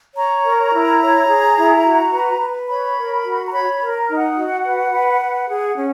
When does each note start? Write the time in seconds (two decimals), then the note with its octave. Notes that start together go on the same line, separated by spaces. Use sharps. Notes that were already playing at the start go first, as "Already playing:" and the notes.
0.16 C#5 A#5
0.44 A#4
0.73 E4
1.01 C#5
1.28 G#4
1.57 E4
1.85 F#4
2.12 B4
2.41 B4
2.68 C#5 B5
2.96 A#4
3.24 F#4
3.46 A#5
3.52 C#5 B5
3.74 B5
3.80 A#4
3.94 A#5
4.09 D#4
4.15 F#5
4.36 F#4
4.64 B4
4.92 B4
5.21 B4
5.48 G#4
5.76 C#4